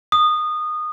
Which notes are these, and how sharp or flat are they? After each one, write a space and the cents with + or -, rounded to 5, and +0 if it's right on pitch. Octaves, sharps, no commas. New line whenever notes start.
D#6 -20